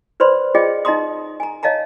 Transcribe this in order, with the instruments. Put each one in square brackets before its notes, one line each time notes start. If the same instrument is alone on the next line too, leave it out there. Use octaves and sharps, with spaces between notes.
[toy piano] B4 C5 D5 B5 C6
F4 G#4 D5 D#5 G5
D#4 D#5 E5 A#5 C6 D#6
G#5 A#5
C#5 D#5 F5 A5 A#5